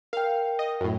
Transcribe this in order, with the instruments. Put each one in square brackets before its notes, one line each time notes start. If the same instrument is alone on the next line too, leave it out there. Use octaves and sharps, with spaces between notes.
[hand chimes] A#4 G5 [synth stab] F5
[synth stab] D#5
F#2 A2